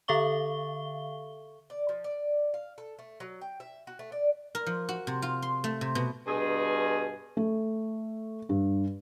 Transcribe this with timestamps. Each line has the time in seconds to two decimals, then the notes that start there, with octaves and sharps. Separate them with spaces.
0.08 D3 A4 E5 F5 C#6 G7
1.70 D5
1.89 F3
2.04 D5
2.54 F5
2.78 A4
2.99 A3
3.20 F#3
3.41 G5
3.60 E5
3.87 F#4
3.99 A3
4.12 D5
4.55 A#4
4.66 F3
4.89 F#4
5.07 C3
5.22 F4
5.42 C6
5.64 A3
5.81 C3
5.95 B2
6.27 G2 B2 G#4
7.37 A3
8.49 G2